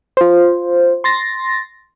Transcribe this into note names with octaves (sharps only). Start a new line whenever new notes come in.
F4 C5
C6 A6 A#6